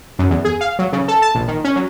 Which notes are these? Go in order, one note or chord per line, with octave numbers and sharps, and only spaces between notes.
F#2
E2
G#4
F5
F#3
C#3
A4
A5
A#1
D#3
C#4
F#3